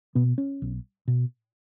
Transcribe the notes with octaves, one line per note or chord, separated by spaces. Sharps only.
B2 B3
C#4
B1
B2